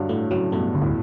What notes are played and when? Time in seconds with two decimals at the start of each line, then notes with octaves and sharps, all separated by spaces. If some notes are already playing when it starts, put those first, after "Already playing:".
Already playing: G2 D3 F#3
0.09 A2 A3
0.31 A2 C#3 F#3
0.52 G2 B2 A3
0.75 D2
0.82 A2